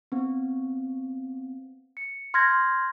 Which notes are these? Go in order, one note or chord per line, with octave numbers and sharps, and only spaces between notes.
B3 C4
C#7
C6 F6 G6 G#6 A#6